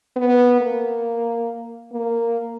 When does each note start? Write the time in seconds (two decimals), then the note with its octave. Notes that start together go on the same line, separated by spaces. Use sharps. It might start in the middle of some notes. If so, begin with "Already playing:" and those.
0.17 B3
0.61 A#3
1.93 A#3